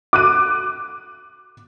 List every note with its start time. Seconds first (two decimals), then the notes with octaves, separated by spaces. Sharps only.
0.13 D6 F#6 D#7